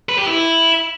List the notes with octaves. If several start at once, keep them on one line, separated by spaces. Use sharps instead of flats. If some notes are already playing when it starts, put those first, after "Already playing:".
B4
G4
E4